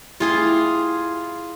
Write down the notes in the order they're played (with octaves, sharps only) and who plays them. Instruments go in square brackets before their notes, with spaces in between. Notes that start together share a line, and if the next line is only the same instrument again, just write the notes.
[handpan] A3 E4 G4 [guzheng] F4 G#4 C6